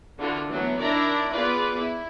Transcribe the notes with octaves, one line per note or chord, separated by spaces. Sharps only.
D3 E3 F4 F#4
E3 F#3 A3 B3
D#3 D4 E4 D5 E5 A#5
B3 F4 G#4 B4 D5
E4